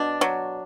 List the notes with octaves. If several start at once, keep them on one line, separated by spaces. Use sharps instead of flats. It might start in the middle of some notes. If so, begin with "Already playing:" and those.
Already playing: B2 D4
F#3